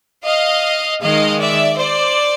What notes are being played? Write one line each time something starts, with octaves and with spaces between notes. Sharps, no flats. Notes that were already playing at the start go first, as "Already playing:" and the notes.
D#5 F5
D#3 G#3 D#5 F5
D5 E5
C5 D5